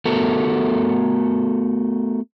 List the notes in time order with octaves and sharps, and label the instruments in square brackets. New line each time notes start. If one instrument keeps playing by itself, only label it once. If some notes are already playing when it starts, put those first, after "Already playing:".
[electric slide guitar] A3 B3 F#4 A4 A#4